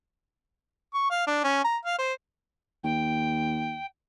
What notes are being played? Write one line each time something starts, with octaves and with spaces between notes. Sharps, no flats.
C#6
F5
D4
C#4
A#5
F5
C5
D#2 G5